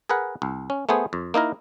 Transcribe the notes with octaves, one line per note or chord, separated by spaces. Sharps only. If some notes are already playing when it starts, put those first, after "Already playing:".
G#4 A#4 B4 F#5
C2
C#4
A3 B3 G#4 C5
F2
A#3 D#4 E4 A#4